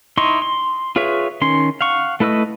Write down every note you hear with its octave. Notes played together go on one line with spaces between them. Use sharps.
D#4 E4 D#5 C6 C#6
C6
F4 G#4 B4 C#5 E5
D#3 C#4 C6
F5 F#5 C#6
A3 E4 B4 D#5 E6